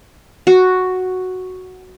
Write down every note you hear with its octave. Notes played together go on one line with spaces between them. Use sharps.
F#4